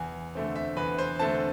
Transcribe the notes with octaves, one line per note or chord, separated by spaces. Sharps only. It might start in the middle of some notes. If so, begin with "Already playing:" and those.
Already playing: E2 G#5
D3 A3 C4
E5
E2 B4
C5
D3 A3 C4 A5